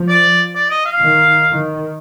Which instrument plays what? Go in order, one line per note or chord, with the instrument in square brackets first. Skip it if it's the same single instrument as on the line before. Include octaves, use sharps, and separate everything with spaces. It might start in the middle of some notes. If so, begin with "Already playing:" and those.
Already playing: [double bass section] F3
[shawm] D5
D5
D#5
F5
[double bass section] D#3
D#3